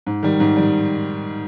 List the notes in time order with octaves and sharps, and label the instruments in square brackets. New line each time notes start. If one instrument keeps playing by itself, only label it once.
[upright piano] G#2
D#3 G3
G#2
D#3 G3